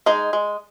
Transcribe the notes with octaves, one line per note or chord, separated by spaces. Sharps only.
G#3 D#4 G#4
G#3